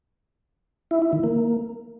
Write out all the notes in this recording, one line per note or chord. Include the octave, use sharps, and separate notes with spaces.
E4
E4
D#3
A#3